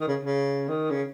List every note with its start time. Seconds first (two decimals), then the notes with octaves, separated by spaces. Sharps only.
0.01 D#3
0.08 C#3
0.23 C#3
0.68 D#3
0.91 C#3